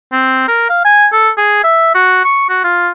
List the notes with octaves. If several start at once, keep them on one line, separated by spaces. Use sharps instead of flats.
C4
A#4
F5
G#5
A4
G#4
E5
F#4
C#6
F#4
F4